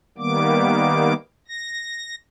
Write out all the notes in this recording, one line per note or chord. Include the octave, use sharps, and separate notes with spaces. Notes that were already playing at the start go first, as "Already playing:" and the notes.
D#3 G3 A#3 B3 D6
A#6